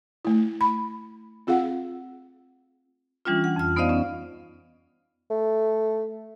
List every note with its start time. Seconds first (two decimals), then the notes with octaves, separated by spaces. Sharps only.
0.25 A3 E4
0.61 B5
1.47 C4 F4 G#4 F5 F#5
3.25 E3 G3 C#4 D4 F4
3.44 F#5
3.56 F2 F6
3.76 B3 D#4 C5 D5 D#5 F5
3.89 C#4
5.30 A3